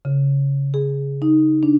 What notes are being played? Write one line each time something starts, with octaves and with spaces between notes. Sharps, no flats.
C#3
G#4
D#4
D4